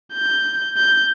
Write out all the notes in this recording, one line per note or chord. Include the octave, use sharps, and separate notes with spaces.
G6
G6